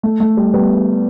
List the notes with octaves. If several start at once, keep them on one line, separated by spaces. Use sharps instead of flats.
A3
A3
G3
G3 B3